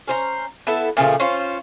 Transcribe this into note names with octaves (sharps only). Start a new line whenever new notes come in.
C#4 C5 A#5
B3 E4 A4 E5
A#2 C#3 F3 A3
C#4 F4 C5